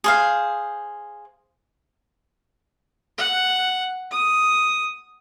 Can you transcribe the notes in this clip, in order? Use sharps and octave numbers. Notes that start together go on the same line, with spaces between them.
G#4 C5 F5
F#5
D#6